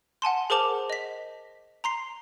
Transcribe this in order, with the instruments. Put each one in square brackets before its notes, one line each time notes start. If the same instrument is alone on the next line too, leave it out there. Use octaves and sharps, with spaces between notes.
[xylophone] F#5 G#5 A5 C6
G#4 A#4 C5 A5 D6 F7
D#5 B6
A#5 C6 C7